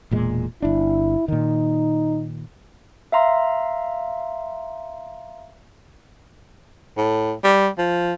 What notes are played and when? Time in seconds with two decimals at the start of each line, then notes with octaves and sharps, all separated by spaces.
0.11 E1 A#2 G#3
0.62 G1 D4 E4
1.28 A#2 D#3 D#4
3.12 E5 F5 A#5 C6
6.97 A2
7.44 G3
7.78 F3